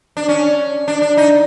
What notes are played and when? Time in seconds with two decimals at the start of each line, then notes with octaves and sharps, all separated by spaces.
0.17 D4
0.29 C#4
0.88 D4
1.02 D4
1.17 D#4